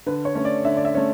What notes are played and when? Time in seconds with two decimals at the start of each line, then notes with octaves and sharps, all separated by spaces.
0.06 D3 B4
0.25 C#5
0.35 A3 C#4
0.45 D5
0.65 D3 E5
0.77 D5
0.85 E5
0.95 A3 C#4